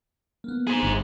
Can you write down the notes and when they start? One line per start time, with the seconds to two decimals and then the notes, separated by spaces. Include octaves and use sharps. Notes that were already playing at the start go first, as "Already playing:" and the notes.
0.44 A#3 B3
0.67 G#4 C5
0.83 G1